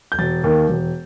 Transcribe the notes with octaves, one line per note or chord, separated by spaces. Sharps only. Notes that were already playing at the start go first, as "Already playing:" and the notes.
G6
E1 A6
D#2 D#3
E1